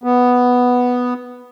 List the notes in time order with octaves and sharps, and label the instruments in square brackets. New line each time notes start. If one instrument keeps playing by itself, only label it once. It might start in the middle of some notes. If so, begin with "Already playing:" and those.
[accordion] B3